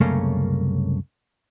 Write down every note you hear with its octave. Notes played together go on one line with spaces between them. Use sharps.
C2 F#2 C#3 A3 A#3 C#4